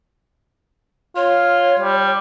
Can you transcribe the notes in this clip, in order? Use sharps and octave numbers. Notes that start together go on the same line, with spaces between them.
F4 C#5
G3